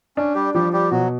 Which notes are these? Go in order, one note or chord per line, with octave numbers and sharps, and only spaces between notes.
C#4 D4
G3 G4
F3 G3 G4
G3 G4
B2 F#3 F#4